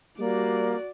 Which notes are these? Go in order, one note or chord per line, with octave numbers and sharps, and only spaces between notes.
G3 A#3 F#4 D5